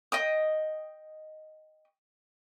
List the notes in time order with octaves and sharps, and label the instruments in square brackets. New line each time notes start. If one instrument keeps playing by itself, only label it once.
[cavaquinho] D#5 G5 D#6